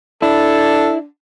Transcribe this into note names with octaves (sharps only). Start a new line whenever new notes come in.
D4 E4 A4